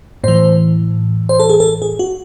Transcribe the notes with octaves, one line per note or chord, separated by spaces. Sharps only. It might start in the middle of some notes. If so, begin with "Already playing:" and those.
A2 E3 C5
C5
A4
G#4
A4
G#4
F#4